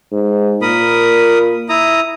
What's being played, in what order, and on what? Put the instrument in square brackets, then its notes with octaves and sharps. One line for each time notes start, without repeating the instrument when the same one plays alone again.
[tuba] G#2
[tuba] A#2 [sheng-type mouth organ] A#4 B5 D#6
[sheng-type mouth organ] E4 A#5 D#6